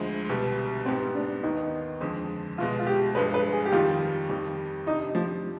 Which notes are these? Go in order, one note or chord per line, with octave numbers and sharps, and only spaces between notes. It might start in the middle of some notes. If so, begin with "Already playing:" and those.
Already playing: D2 D3 F3 G#3
C2 B2 G3
G#2 G3 B3 C4
D4
D#2 D#3 B3 D#4
F2 D3 F3 G#3
C2 B2 G#3 F4
F4
G4
G2 F3 G#3 B4
B4
G#4
G4
F2 D#3 G3 F4
F2 D#3 G3
C3 G3 D4 D#4
F3